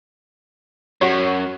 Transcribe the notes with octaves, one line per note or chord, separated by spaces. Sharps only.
F#2 F#4 C#5